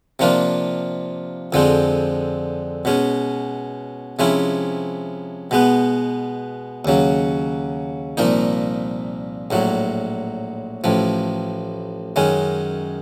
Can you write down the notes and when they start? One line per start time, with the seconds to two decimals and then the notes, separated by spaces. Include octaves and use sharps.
0.19 C3 F3 A#3 D4 F4
1.53 F2 D3 F3 G#3 C4
2.85 B2 G#3 C#4
4.19 C3 F3 G#3 C#4 E4
5.51 B2 G#3 B3
6.85 D#2 C#3 F#3
8.17 C2 A#2 F3 A#3 D#4
9.51 A#1 A2 F#3
10.84 A1 A2 F3
12.16 F#2 D#3 G#3 C#4